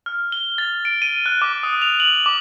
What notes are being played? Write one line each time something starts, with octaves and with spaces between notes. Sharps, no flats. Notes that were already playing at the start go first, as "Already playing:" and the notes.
F6
G7
A6
D7
D#7
F#6
D6
D#6
F7
F#7
D6